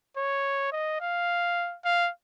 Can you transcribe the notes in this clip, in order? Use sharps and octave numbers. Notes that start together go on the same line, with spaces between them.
C#5
D#5
F5
F5